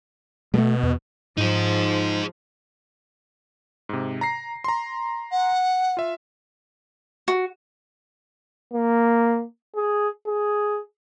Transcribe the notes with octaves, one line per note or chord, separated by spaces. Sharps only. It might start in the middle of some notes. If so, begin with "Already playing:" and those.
B2 G#3 A3
E2
G#2 F3 D#4 G#4
G#2 C3
A#5 A#6 C7
A#5 C6
F#5
F4 E5
F#4
A#3
G#4
G#4